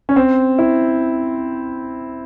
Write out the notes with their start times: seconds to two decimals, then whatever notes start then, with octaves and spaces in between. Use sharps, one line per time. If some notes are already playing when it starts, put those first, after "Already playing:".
0.09 C#4
0.16 C4
0.58 E4